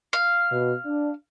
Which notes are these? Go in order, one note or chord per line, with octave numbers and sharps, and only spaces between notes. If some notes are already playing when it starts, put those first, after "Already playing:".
F5
B2
D4